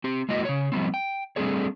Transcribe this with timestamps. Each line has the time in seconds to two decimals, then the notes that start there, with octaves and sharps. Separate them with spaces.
0.04 C4 G4
0.29 G#3 A#3 E4 F#4 D#5
0.45 C#3 C#5
0.72 F3 G3 B3 C4
0.94 G5
1.36 G3 A3 C4 D4 G#4 C#5